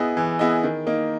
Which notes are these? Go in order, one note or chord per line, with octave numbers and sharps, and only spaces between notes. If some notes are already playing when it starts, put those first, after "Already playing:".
Already playing: B3 E4 G#4 D#5
E3
B3 E4 G#4 D#5
D#3
A#3 D#4